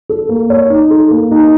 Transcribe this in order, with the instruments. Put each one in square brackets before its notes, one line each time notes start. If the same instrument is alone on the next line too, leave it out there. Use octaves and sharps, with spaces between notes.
[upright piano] A4
A#3
C#5
D#4
A4
A#3
D#4